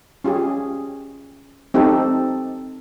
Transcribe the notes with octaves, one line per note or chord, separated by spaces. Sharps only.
C#4 F4 G4 G#4
C4 D#4 G4 A4